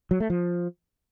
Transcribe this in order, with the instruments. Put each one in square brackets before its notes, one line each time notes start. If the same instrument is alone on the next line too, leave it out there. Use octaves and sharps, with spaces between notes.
[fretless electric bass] F#3
A3
F3